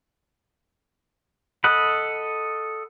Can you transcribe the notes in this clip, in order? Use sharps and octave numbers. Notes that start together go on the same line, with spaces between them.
A4 D#5 F#5 B5